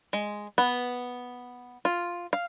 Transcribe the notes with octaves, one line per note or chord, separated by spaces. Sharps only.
G#3
B3
F4
F5